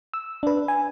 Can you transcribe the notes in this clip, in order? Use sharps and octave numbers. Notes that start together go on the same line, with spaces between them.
E6
D4 B4
G#5